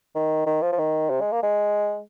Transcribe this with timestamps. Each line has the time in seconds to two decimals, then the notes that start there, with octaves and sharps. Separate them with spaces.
0.15 D#3
0.47 D#3
0.62 F3
0.72 F3
0.79 D#3
1.10 C3
1.21 G#3
1.32 A#3
1.43 G#3